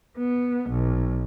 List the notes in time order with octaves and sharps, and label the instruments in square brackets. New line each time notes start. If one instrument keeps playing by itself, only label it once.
[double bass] B3
B1